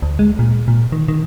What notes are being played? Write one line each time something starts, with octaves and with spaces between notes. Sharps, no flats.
D2
G#3
A#2
A#2
D#3
D#3